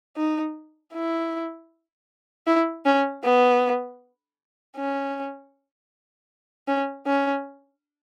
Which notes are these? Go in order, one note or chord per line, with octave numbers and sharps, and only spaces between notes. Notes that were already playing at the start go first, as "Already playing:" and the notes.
D#4
E4
E4
C#4
B3
C#4
C#4
C#4